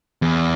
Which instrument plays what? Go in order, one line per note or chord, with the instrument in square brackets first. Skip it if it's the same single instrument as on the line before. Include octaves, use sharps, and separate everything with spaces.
[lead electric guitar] E2